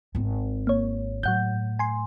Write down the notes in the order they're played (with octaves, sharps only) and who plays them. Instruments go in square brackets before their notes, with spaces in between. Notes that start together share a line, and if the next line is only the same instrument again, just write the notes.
[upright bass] G#1 C4
[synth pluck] A#3 C#5
[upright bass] A2 [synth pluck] F#3 F#5 G6
[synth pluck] G#5 C6